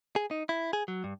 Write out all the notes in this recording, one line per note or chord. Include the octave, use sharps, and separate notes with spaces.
G#4
D#4
E4
G#4
F#3
G2